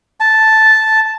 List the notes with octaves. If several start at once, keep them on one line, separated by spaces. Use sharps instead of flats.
A5